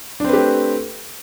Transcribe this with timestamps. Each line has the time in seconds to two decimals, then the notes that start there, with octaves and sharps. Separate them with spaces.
0.20 D4
0.24 C4
0.29 B4
0.33 G4
0.38 A3